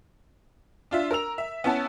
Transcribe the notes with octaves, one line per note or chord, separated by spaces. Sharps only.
D4 F4 E5
A#4 A#5 E6 F7
E5
B3 C#4 E4 F#5 A5